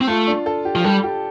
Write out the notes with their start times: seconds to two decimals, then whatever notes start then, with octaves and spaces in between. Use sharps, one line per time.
0.01 C4
0.07 A3 F4
0.27 D4
0.46 A4
0.65 G4
0.76 F3
0.84 G3 A4
1.03 G4